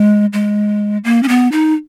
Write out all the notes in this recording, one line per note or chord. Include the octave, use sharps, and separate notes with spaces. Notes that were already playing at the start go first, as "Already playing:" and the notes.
Already playing: G#3
G#3
A#3
C#4
B3
D#4